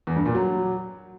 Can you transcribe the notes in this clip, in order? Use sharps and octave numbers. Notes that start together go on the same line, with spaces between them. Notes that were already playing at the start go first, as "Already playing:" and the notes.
E2
G2
A#2
F#3